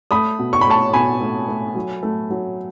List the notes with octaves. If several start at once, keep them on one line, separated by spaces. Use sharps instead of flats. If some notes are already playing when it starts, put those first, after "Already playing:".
A3 B5 D#6
B2
C#6
B5
A3 A5 C#6
B2 G#5 B5
A3
A3
F#3
A3
F#3